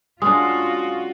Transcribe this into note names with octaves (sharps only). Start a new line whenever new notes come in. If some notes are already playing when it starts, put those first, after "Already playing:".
G#3 C#4 D4 F4 F#4 G#5 D#6